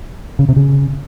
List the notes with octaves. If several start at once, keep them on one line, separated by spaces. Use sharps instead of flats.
C#3
C3
C#3